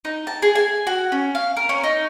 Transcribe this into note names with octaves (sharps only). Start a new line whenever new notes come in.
D#4
A5
G#4
G#5
F#4
C#4
F5
A#4
C#4
D#4